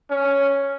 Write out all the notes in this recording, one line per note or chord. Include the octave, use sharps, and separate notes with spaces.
C#4